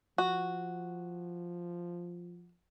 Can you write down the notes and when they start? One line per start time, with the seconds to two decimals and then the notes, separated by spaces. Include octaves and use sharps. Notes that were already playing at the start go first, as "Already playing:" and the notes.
0.18 F3 F#4